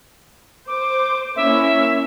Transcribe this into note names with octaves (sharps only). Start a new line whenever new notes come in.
C5 D6
A#3 C#4 E4 E5